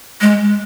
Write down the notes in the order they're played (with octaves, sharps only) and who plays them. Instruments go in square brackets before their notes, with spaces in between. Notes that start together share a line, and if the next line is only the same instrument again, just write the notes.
[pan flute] G#3